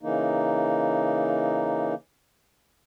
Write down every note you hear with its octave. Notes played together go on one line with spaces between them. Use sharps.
C#3 E3 A#3 D#4